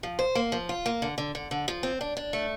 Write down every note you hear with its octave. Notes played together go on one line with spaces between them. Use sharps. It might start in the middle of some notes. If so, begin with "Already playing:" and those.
F3
C5
A#3
F3
F4
A#3
D3
D3
D3
D3
F3
C4
D4
D4
A3